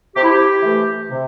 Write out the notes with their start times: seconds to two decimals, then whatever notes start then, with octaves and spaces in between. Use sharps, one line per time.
0.16 C3 G4
0.23 E4
0.30 G4
0.63 E3 A3
1.10 C3